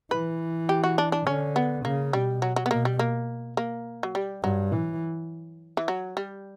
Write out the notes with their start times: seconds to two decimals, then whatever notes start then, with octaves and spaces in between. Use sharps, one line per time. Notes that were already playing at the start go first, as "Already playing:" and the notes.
0.11 E3 B4
0.69 G4
0.84 F#4
0.98 D4
1.12 D4
1.26 D3 C#4
1.56 B3
1.85 C#3 A#3
2.13 B2 G3
2.42 F#3
2.56 F#3
2.66 B3
2.71 B2 A#3
2.85 G3
2.99 A#3
3.57 A#3
4.03 F#3
4.15 G3
4.44 G2 F#3
4.72 E3
5.77 E3
5.88 F#3
6.17 G3